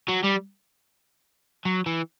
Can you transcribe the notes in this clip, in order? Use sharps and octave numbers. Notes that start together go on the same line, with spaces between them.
F#3
G3
F#3
E3